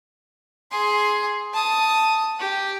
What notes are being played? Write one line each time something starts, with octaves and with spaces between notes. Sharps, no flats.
G#4 C6
A5 D#6
G4